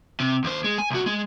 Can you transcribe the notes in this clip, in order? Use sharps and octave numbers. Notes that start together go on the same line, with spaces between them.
C3
D#2 C5
G#3
G#5
C2 F#4
G#3